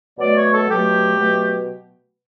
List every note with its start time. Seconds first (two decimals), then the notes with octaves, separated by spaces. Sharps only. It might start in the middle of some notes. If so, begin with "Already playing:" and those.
0.19 B2 F#3 A3 D5
0.36 C#5
0.51 A4
0.68 B2 F#3 A3 G4
1.18 B2 F#3 A3